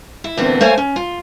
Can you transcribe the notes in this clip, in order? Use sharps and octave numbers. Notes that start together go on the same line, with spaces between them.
E4
D2 A#2 E3 B3 C4 D4
A3 A#3 C5 C#5 G#5
C#4
F4